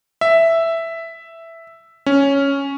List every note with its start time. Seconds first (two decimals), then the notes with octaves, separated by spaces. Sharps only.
0.21 E5
2.06 C#4